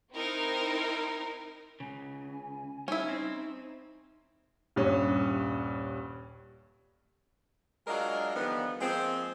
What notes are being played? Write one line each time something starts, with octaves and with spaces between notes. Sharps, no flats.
C4 D#4 E4 A#4
C#2 C#3 G#5
G3 C#4 D#4 E4
C4
D#1 G2 C#4
F#3 G#3 D4 F4 A#4 D#5
D3 D#3 F3 G3 B3
F3 G#3 A#3 C4